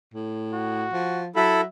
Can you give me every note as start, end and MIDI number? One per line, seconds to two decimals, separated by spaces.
0.14 0.86 45
0.53 1.23 66
0.93 1.28 53
1.36 1.64 54
1.36 1.61 64
1.36 1.61 69
1.36 1.67 76
1.36 1.61 83